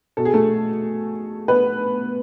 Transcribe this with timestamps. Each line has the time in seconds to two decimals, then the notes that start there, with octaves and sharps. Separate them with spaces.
0.17 B2 A4
0.25 G#4
0.34 A3 A4
1.48 B3 B4